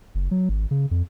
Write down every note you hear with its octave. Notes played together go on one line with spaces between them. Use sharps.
F#1
F#3
G#1
C#3
F2